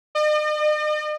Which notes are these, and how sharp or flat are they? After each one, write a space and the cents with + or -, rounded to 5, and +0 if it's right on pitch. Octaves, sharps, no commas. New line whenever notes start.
D#5 -45